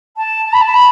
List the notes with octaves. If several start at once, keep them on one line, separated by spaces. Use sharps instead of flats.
A5
A5
B5
A5
B5